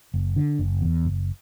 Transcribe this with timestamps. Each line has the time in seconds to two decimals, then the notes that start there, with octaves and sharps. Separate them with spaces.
0.14 F#1
0.36 D3
0.59 F#1
0.82 E2
1.05 F#1